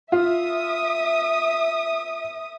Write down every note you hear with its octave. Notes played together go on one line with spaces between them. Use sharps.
F4 E5 D#6